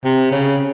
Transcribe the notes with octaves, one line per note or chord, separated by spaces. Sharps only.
C3
C#3